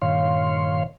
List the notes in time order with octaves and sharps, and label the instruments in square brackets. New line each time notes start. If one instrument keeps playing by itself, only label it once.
[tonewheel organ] G2 A#2 D#3 C#5 F5 C6